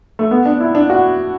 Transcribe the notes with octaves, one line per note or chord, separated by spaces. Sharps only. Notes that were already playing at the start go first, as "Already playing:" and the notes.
A3
B3
D4
E4
D4
F#4